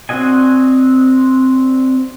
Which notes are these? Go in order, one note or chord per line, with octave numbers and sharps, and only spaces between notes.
C4 D4 F#4 D#5 G#5